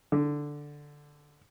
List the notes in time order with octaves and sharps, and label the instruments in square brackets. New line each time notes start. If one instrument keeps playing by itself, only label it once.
[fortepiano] D3